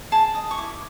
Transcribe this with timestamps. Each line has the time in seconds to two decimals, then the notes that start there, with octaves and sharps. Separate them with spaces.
0.12 G#4 A5
0.35 D#5
0.51 C#6
0.58 E4 D6